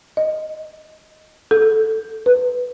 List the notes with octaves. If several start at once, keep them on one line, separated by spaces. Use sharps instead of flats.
D#5
A4
B4